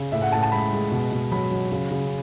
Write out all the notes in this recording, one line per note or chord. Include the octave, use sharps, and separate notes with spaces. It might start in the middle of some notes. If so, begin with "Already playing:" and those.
Already playing: C#3
A2 E5
F#5
A2 A5
A5
G#3 B5
G#3
B2
B2
F#3 B5
F#3
C#3
C#3